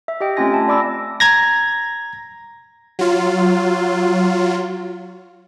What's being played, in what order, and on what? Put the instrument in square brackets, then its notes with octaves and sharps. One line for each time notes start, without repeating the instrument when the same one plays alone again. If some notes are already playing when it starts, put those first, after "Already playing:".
[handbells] E5
G4 D#5 G5
A3 C4 C#4 F4 G#5 A#6
E5 A5
D5 B5 D6 E6 A#6
[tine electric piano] A#5 G#6 A#6
[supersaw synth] F#3 F4